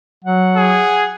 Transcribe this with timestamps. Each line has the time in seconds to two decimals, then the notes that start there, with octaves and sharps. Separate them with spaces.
0.25 F#3 F#5
0.56 G#4